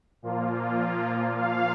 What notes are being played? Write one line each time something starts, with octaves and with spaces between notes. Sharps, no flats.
A#2 F3 A#3 F4
F5